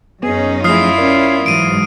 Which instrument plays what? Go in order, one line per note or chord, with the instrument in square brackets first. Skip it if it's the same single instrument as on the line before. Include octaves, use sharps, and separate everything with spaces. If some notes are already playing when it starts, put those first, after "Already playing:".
[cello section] F#2 C#4 D#4 [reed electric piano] B3 [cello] G#4
[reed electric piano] F3 A3 G#4 [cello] E4 F4 [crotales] D#6 F6 C7
[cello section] C#4 [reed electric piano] A#4 D5
[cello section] G#2 E3 F#3 [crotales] D7 D#7